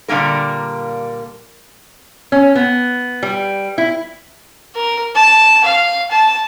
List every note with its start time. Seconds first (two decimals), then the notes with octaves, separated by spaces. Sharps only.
0.08 A#2 D3 G3 A#3 A#4
2.32 C#4
2.55 B3
3.23 G3
3.78 E4
4.75 A#4
5.15 A5
5.64 F5
6.11 A5